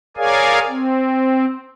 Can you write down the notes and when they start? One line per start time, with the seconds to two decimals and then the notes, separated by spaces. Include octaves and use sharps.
0.17 G#4 A#4 C#5 D5 F5 G#5
0.68 C4